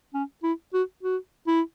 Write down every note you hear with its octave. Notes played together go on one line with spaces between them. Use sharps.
C#4
E4
F#4
F#4
E4